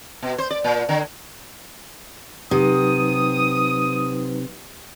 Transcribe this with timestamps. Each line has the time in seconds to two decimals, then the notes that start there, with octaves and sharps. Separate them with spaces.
0.22 B2
0.38 C5
0.51 D5
0.64 A#2
0.89 D3
2.51 C3 F#3 D#4 B4 D#6